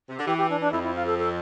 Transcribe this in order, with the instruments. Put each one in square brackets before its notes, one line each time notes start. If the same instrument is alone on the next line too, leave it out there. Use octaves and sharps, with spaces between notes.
[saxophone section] C3
D3
[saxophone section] E3 [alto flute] G4
[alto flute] G4
D4
D4
[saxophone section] F2 [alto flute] E4
[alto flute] E4
F4
A4
A4